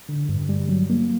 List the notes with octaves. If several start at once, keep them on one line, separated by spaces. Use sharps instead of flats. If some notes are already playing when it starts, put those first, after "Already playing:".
D3
G2
G3
F#3
A#3